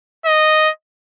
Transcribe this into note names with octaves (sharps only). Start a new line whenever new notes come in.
D#5